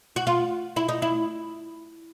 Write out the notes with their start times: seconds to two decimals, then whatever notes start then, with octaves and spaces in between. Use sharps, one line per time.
0.16 F#4
0.27 F4
0.76 E4
0.89 D#4
1.02 E4